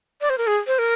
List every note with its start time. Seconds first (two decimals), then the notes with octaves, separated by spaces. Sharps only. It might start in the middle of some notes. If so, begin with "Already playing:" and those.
0.21 D5
0.30 C5
0.38 A#4
0.47 G#4
0.67 C5
0.79 A#4